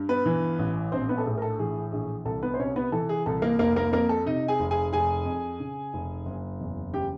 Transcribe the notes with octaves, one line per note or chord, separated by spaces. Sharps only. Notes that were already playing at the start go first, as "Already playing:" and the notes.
Already playing: G2
B3 B4
E3
A1
A#1 C4 C5
B3 B4
A4
A2 G#4
A#4
A4
E3 G#4
A#1 G#4
C2 A4
B3 B4
C5
C3 C#4 C#5
B3 B4
E3 A4
G#4
C2 A4
A#3 A#4
F1 A#3 A#4
A#3 A#4
F2 A#3 A#4
A4
C3 D#4 D#5
G#4 G#5
F1
G#4 G#5
F1 G#4 G#5
F2
C#3
F1
F#1
E2
C#3 G4 G5